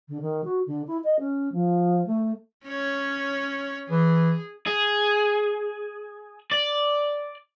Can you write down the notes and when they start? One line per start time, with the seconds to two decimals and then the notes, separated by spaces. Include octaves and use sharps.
0.08 D3
0.21 D#3
0.44 F#4
0.66 D3
0.87 E4
1.04 D#5
1.19 C#4
1.52 F3
2.06 A3
2.64 C#4 C#5
3.90 E3 G#4
4.67 G#4
6.51 D5